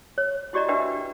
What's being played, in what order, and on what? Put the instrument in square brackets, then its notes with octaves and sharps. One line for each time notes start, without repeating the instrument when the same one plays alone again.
[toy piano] C#5
E4 F#4 G4 D5 D#5 A#5
D4 F#4 A#4 B4 E5 G5
B4